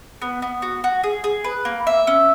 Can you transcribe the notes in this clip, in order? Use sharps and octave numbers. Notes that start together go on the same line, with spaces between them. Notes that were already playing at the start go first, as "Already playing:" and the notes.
B3
B3
F#4
F#4
G#4
G#4
B4
A#3
E5
C#4